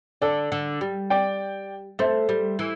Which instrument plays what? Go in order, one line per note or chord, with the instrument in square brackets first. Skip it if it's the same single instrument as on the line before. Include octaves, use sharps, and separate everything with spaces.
[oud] D3 [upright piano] A4 D5
[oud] D3
G3
[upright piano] D5 G5
[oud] A3 [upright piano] C5 E5
[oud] G3
E3